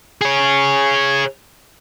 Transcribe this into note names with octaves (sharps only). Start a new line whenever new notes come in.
G#4 C#5